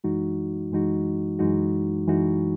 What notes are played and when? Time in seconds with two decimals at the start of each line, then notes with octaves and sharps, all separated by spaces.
0.04 F#2 E3 G#3 D#4 F#4
0.71 F#2 E3 G#3 D#4 F#4
1.39 F#2 E3 G#3 D#4 F#4
2.07 F#2 E3 G#3 D#4 F#4